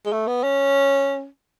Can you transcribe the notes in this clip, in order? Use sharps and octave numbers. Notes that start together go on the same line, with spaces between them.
G#3
A3
B3
C#4